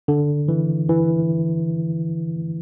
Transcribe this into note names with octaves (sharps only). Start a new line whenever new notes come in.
D3
E3
E3